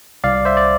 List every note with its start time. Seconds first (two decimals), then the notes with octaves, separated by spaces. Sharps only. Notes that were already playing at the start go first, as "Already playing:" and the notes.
0.24 C2 D5 F5
0.45 C5 E5
0.57 D5